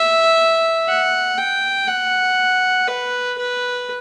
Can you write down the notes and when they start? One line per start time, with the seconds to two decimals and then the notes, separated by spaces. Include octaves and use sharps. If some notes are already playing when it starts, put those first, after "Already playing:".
Already playing: E5
0.88 F#5
1.38 G5
1.88 F#5
2.88 B4
3.38 B4